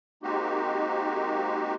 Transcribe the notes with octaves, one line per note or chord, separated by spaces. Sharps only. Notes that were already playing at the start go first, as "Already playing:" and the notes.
G#3 A#3 C4 D#4 F#4 G4